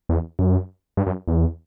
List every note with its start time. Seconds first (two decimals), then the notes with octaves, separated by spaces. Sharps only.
0.09 E2
0.39 F#2
0.97 G2
1.07 F#2
1.28 E2